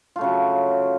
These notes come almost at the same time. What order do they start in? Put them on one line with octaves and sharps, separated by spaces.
F4 A3 C#3 F#3